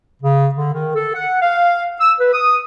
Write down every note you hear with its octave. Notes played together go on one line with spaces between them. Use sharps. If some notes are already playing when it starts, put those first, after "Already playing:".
C#3
D3
D#3
A4
F#5
F5
E6
B4
D#6